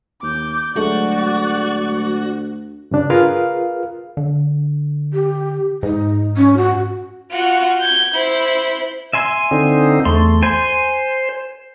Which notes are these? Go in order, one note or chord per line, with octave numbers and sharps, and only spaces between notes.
D#2 D6 G6
D2 F#3 G#3 A3 F#4 D5
G2 C#3 D4
F4 G#4 A#4 B4 F5
D3
G4
G#2 D#4
C#4
F#4
F4 F#4
G6 G#6
E4 C5
E5 G#5 C6
D3 C4 D#4
E2 A3 C6
C5 G#5 C6